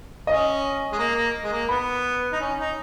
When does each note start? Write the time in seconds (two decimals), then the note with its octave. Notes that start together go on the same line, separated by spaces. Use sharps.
0.27 C#4 D#5
0.92 G#3
0.98 A#3
1.15 A#3
1.44 G#3
1.52 A#3
1.69 B3 B5
2.32 D#4
2.40 C#4
2.59 D#4